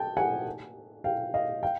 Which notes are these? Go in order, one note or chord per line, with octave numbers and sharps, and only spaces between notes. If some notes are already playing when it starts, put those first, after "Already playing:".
Already playing: G5 A5
F#5 G#5
F5 G5
D#5 F5
F5 G5